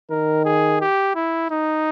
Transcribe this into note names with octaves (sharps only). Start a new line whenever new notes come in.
D#3 A#4
G#4
G4
E4
D#4